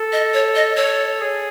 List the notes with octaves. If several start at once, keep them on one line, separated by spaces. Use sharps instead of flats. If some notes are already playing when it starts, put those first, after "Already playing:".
Already playing: A4
D#5
C#5
D#5
A4 C#5
G#4